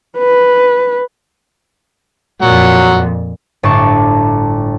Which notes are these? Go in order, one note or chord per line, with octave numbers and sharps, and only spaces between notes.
B4
F2 A#2 F#3 F#5
G1 A2 D5 A5 C#6